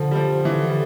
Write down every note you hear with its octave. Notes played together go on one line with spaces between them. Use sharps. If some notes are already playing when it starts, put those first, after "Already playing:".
Already playing: D3 F3
G3
F3
E3
G3